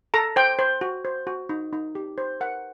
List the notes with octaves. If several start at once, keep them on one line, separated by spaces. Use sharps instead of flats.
A4 A#5
C5 G5
C5
F#4
C5
F#4
D#4
D#4
G4
C5
A#4 F#5